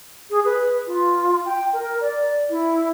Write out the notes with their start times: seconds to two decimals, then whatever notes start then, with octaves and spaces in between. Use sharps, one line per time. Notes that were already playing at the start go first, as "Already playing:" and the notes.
0.30 G#4
0.45 B4
0.87 F4
1.45 G5
1.73 A#4
2.01 D5
2.50 E4